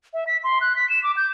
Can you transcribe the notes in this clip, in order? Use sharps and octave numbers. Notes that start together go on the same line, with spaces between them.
E5
B6
C6
F#6
B6
E7
D6
G6